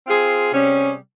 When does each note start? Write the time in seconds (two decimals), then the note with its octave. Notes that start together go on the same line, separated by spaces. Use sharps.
0.06 C4 F4 G#4 C5
0.51 C3 G3 C#4 G#4